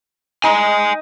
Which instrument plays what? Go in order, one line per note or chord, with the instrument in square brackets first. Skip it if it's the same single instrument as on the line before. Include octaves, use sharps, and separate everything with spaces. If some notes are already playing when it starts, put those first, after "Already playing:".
[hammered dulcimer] D#4 [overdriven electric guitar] D#5 G#5